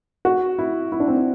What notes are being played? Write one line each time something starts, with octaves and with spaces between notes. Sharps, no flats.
F#4
E4
E4
D4
C4
D4